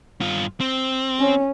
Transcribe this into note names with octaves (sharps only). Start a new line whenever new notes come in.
G2 F4
C4
C#4